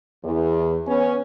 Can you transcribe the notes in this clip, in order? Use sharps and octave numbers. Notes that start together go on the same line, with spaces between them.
E2
B3 C#4